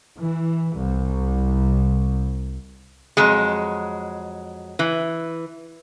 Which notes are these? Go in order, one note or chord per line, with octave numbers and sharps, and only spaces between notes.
E3
C2
F2 F#3 G#3
E3